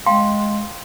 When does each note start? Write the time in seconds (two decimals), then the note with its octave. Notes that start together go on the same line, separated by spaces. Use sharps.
0.06 G#3 F5 G5 C6